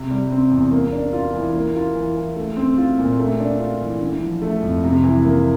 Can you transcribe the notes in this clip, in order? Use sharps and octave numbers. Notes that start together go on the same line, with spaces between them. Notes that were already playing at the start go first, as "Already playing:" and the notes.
Already playing: C3
G3
C4
E2
A#3
D4
F4
E3
A#3
F4
E3
E3
A3
C4
F4
A#2
A3
D4
F4
E3
D3
F3
A3
F2
C3
E3
A#3